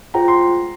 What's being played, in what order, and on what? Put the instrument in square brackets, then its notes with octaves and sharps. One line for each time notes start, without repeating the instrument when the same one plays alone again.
[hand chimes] F4 G#4 C5 G5 [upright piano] A#5
[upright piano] C6
C6